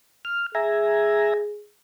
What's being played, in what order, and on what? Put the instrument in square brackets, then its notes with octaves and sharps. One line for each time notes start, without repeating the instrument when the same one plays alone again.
[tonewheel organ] F6
[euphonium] G#4 [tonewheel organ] E5 G#5 A#5